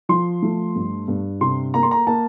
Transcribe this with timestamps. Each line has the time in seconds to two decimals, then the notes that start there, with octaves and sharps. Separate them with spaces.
0.09 F3 C6
0.43 A3
0.75 G2
1.08 G2
1.41 C3 C6
1.74 A#3 A#5
1.83 C6
1.91 A#5
2.07 A#3 A5